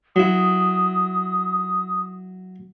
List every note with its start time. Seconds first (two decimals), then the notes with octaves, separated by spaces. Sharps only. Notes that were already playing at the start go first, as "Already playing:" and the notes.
0.16 F#3 E4 D#6